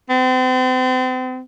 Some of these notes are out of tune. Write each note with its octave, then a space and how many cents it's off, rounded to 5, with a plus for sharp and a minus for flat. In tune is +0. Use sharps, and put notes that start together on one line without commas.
C4 -40